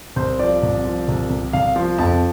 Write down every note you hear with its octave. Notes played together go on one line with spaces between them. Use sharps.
C2 C5
F3 D5
C2
F3
C2
C2
C2 F5
F3
F2 A5